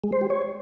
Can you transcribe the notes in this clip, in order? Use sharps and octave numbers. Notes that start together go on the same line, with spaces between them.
G#3
C5
G4
C#5